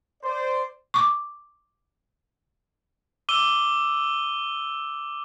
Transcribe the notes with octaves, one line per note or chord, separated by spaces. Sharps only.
C5 D5
C#6 D6
D6 E6 D#7 G7